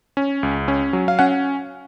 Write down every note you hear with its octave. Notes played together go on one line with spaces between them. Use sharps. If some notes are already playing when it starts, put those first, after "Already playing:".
C#4
C#2
C#4
F#3
F5
C#4 F#5